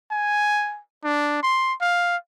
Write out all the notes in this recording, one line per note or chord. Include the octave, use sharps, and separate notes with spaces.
G#5
D4
C6
F5